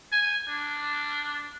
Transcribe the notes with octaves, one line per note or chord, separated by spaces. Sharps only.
G#5
D4